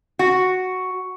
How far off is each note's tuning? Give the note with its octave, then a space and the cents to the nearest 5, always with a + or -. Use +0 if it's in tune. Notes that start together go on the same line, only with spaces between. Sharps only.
F#4 +0